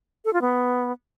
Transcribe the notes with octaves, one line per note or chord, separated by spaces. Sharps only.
A4
F4
B3